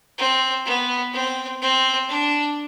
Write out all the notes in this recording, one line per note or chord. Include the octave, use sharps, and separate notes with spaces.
C4
B3
C4
C4
D4